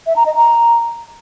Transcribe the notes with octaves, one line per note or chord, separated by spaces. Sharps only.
E5
A#5
D#5
A#5